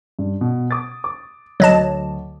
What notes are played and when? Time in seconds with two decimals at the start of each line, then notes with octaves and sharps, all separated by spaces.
0.19 G2
0.41 B2
0.71 D6 D#6 A6
1.04 D6
1.60 D2 F#3 D#5 A5